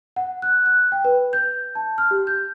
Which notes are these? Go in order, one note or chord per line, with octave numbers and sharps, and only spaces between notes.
F#5
F#6
F#6
G5
B4
G6
A5
F6
G4
G6